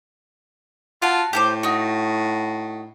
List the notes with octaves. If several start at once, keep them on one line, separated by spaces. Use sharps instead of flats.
F4 F#4 A5
A2 G4 A4 C5
D#4 F#4